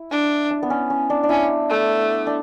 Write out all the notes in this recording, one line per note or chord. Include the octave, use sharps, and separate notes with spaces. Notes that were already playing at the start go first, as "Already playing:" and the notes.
Already playing: E4
D4
D4
B3
C#4
C#4
D4
D4
C#4 E4
A3
D4